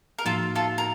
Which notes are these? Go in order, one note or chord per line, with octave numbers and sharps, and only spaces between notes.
A#4
A2 F3 A#3 D#4 F4 F#4 A4
F4 A4
A#4